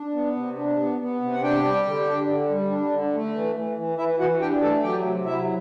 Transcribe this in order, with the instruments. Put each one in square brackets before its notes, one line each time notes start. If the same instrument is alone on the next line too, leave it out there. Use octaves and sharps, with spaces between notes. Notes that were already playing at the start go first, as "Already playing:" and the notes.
Already playing: [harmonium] D4
B3
C3
D4
B3
B3
C3
F#5
D4 G4 G5
G3
D3
D4
D3
G3
D4
D3
A3
E3
E3
E3
E3 E4 E5
E3 F#4 F#5
D4 G4 G5
A3 A4 A5
F#3 G4 G5
C3
F#3 E4 E5